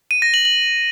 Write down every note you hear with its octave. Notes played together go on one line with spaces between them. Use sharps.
D#7
A#6
F#7
F#7